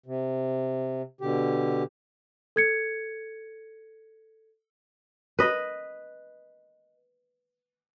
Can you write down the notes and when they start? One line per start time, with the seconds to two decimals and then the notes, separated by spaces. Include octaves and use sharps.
0.06 C3
1.21 B2 D3 G4
2.56 A4 G#6 C#7
5.39 B4 D#5